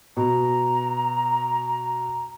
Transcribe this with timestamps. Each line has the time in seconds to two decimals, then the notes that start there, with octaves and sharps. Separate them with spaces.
0.17 B2 A#5